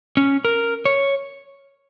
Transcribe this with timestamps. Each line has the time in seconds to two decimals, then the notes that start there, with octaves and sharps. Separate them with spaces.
0.17 C#4
0.45 A#4
0.85 C#5